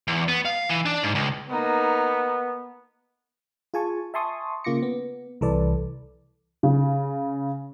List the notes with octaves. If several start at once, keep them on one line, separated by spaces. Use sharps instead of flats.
E2
B3
F5
E3
D4
G#2
C#2
A#3 B3 D#4
F4 G#4 G#5 A5 C#6
E5 G#5 A5 C6 C#6 D#6
C#3 A#3 F4 D6 A#6 C#7
B3
C2 E3 A4 B4 D5
C#3